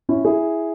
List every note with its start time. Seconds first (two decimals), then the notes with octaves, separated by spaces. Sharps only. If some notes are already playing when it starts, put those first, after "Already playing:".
0.09 C#4 E4
0.25 E4 G#4